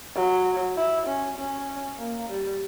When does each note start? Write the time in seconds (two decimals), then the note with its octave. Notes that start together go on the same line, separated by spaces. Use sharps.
0.16 F#3
0.77 E4
1.07 C#4
1.38 C#4
1.99 A#3
2.29 G3